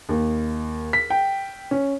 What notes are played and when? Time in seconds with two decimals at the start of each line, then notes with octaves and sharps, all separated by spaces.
0.09 D#2
0.93 B6
1.10 G5
1.71 C#4